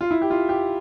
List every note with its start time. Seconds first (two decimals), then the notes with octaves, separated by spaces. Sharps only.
0.01 F4
0.11 E4
0.22 G4
0.30 F4
0.49 G4